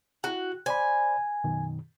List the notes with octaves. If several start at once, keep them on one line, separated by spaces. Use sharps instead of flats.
E4 F#4 F#5
C5 D5 G#5 B5
F#2 B2 D#3